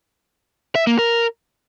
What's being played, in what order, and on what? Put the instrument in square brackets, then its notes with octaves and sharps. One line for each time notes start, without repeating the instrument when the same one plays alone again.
[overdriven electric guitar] E5
A#3
A#4